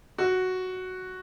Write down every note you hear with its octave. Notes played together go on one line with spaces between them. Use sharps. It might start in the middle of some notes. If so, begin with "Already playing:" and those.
F#4